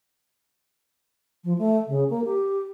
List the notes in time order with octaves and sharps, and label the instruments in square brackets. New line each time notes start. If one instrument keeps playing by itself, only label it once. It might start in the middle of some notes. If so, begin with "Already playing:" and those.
[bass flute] F3
A3
C#3
A#3
G4